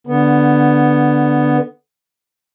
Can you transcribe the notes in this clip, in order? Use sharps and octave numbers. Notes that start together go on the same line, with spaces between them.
D3 B3